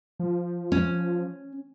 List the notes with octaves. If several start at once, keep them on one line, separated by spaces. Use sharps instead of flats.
F3
C#4